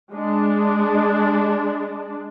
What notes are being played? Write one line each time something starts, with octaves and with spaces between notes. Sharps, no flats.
G#3 D4